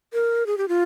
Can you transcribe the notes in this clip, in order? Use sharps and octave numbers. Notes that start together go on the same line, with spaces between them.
A#4
G#4
G4
F4